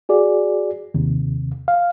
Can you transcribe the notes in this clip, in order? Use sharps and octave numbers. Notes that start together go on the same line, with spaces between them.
F#4 G#4 D5
D#2 C3
F5